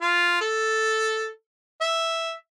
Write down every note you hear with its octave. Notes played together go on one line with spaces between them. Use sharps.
F4
A4
E5